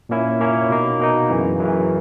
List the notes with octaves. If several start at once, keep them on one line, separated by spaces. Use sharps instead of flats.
A#2 A#3 C#4 E4
A#2 A#3 C#4 E4
B2 A#3 D#4
B2 A#3 D#4
F#2 C#3 E3
F#2 C#3 E3